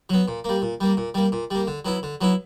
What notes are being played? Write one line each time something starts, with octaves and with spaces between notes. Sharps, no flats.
F#3 B3
A#2
G3 A#3
A#2
G3 A#3
A#2
G3 A#3
A#2
G3 A#3
D3
F#3 B3 E4
D3
F#3 B3 E4